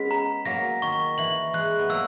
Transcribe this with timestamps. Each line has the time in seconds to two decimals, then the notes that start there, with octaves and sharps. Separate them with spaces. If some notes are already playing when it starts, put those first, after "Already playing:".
Already playing: G#3 B3 C#4 B6
0.11 A#5
0.45 F#3 A#3 A#6
0.82 D#3 C#6
1.18 E3 F#7
1.53 E3 G#3 F#6
1.79 B3
1.89 F#3 A#3 E6